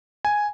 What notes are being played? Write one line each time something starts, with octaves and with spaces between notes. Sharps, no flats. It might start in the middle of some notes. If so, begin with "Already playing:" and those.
G#5